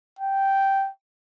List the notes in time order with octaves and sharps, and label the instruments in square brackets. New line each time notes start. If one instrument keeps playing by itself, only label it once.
[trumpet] G5